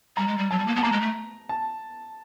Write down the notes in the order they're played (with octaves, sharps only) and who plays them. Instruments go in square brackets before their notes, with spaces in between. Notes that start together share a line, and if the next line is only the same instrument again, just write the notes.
[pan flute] G3 [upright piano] A#5
[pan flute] G#3
G3
[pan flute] F#3 [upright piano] A5
[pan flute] G3
A#3
[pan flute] B3 [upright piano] A5
[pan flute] A#3 [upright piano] A#5
[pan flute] G#3
A3
[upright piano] A5